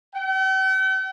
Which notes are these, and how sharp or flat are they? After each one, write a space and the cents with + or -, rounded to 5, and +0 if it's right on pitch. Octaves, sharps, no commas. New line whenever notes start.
G5 -45